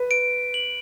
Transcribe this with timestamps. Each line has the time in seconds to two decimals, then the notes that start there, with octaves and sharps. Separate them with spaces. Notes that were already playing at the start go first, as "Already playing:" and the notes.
Already playing: B4
0.11 D7
0.54 F#7